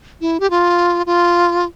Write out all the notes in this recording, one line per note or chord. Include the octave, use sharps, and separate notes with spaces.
E4
G4
F4
F4